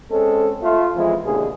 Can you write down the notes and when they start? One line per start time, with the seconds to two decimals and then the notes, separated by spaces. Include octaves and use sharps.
0.11 G#3 C4 C#4 A4
0.62 A3 F4
0.95 F2 E3 F3 G#3 B3 E4
1.24 A1 D#2 B2 D3 G#4